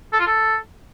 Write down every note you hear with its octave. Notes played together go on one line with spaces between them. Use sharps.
A4
F4
A4